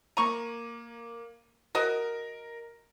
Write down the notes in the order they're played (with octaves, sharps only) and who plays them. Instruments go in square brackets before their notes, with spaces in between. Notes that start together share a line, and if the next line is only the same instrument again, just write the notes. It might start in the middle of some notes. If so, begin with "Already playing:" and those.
[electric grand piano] A#3 D#7 [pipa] A#5 C#6
[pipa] F#4 D#5 [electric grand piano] A#4